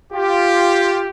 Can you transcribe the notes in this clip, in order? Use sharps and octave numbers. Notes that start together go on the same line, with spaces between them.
F4 G4